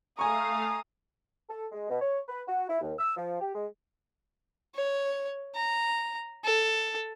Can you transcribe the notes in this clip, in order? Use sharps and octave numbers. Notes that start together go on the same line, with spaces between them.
A3 F5 G#5 A#5 C#6 D#6
A4
G#3
B2
C#5
B4
F#4
E4
D#2
E6
F3
G4
G#3
C#5
A#5
A4